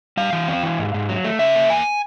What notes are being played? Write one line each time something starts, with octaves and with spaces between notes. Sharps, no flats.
G3 F5
E3
C4
E3
G#2
G#2
F#3
A3
C#3 E5
A#3
E2 G#5